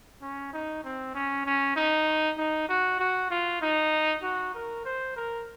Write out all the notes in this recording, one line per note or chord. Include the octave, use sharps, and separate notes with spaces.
C#4
D#4
C4
C#4
C#4
D#4
D#4
F#4
F#4
F4
D#4
F#4
A#4
C5
A#4